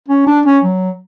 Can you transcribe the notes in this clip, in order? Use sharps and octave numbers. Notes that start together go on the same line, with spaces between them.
C#4
D4
C#4
F#3